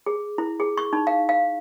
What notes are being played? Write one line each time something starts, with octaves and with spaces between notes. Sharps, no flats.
G#4
E4
G#4
C#6
D#4
F5
F5